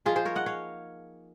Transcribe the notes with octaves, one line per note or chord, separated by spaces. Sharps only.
F3 A#3 D#4 F4 G#4
G#4 C5
A#4 C#5
D#5 F#5
C#5 F5